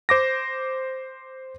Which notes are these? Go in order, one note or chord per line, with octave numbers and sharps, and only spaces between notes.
C5 D6 A#6